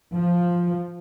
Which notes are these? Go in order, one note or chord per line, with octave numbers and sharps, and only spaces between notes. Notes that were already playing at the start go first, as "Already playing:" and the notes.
F3